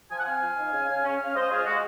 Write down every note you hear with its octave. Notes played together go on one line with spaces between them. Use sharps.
F3 G#5
F#5
C4 F5 G#5
F3
D#4
C#3
C#3
C#4
C#4 F5
G#3 C5 D#5
G#3 F4 G#4
G#3 F#4